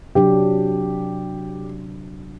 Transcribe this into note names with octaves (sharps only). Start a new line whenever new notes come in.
C3 F#3 D4 G4